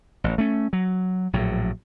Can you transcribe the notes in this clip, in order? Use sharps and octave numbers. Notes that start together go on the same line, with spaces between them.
A1
A3 C#4
F#3
A#1 A2 F#3